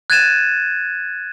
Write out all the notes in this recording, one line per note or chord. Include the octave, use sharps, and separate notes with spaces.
F#6 G#6 A6 D#7 E7